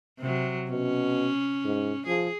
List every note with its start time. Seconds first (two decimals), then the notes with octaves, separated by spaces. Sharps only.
0.19 C3 F#3
0.70 B2 C#4
1.65 G#2
2.07 F3 G#4